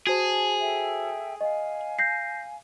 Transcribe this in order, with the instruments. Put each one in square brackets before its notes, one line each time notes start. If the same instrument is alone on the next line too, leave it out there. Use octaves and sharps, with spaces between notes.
[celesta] F#4 C5 [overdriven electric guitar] G#4 [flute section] A5
[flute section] A4 E5 G5
[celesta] D#5 [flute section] F5 G#5
[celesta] G6 A#6 C7